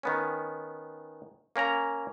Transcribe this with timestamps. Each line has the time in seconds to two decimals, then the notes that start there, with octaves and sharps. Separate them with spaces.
0.03 D#3 B3 C#4
1.56 A#3 C#4 A#4 A#5